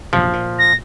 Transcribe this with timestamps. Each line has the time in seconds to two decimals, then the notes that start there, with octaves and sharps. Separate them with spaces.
0.13 A#1 F#2 C3 F3
0.33 A#2
0.59 A#6